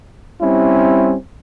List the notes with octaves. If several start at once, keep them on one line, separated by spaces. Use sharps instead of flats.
G3 C4 C#4 E4